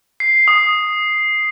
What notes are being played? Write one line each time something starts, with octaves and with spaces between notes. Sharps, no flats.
C7
D#6